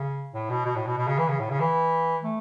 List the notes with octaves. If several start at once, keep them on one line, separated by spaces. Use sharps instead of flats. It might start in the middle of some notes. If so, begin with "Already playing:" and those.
Already playing: C#3
A2
B2
B2
A2
B2
B2
C#3
E3
C#3
A2
C#3
E3
A3